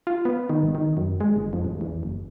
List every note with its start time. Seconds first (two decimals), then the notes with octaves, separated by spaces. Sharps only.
0.07 F4
0.25 B3
0.49 D#3
0.63 G#1
0.75 D#3
0.97 F#2
1.21 G#3
1.36 G1
1.53 F2
1.65 A1
1.81 E2
2.03 F#1